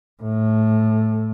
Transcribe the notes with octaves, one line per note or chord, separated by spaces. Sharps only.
A2